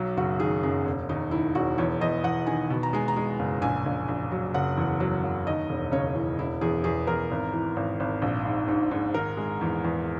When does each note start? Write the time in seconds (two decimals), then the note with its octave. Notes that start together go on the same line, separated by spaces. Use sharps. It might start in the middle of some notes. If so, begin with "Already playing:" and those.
Already playing: B1 F#3
0.17 F#1 F#4
0.40 D#3 G#4
0.63 F#2 G#4
0.86 E1
1.09 D#2 D#4
1.31 D#3 E4
1.55 E1 F#4
1.78 E2 C#5
2.01 E2 D#5
2.24 E2 F#5
2.47 D#3 G#5
2.70 B2
2.83 A#5
2.93 G#3 G#5
3.08 A#5
3.17 G#3
3.39 F#1
3.62 A#1 G#5
3.86 A#1
4.09 A#1
4.32 F#3
4.54 F#1 F#5
4.77 E2
5.00 F#3
5.23 F#1
5.47 D#2 D#5
5.69 E1
5.92 C#3 C#5
6.15 E3
6.39 E1 E4
6.61 E2 G#4
6.84 E2 G#4
7.07 E2 A#4
7.31 G#1
7.53 E3
7.76 G#1
8.00 G#1
8.22 A#1
8.46 G#2
8.68 G#2
8.91 G#2
9.14 D#3 A#4
9.37 G#3
9.61 E2
9.84 E2